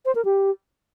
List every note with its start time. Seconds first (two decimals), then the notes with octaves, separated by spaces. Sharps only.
0.05 C5
0.15 A#4
0.25 G4